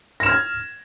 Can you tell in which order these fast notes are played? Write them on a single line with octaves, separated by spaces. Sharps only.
A#6 E7 F6 G#6